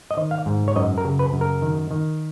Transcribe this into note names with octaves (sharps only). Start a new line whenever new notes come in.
D#5
D#3
F5
G#2
C#5
F#2 D#5
A#4
C#3
B4
F#2
A#4
D#3
D#3